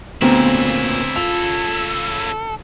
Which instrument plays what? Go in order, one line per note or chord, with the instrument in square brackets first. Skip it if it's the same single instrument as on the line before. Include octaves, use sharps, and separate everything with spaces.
[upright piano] D2 C4 A#5 [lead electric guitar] A#2 [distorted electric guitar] C#3 E4 [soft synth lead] B3
[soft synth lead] F4 [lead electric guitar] A4 [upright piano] F7